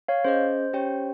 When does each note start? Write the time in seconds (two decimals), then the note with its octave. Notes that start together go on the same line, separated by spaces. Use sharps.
0.08 C#5 F5
0.25 C#4 G#4 C5 D#5
0.73 C#4 G4 C#5 G5